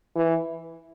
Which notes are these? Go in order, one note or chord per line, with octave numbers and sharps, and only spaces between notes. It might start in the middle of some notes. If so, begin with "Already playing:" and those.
E3